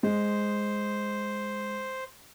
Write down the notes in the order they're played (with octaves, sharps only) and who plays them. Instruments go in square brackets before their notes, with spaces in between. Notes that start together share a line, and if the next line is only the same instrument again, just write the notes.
[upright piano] G#3 [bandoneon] C5